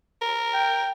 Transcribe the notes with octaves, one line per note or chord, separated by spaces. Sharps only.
A#4
G5